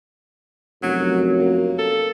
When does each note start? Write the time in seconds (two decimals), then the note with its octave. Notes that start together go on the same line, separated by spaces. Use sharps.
0.83 F1 F#2 F#3
1.39 A#3
1.79 A4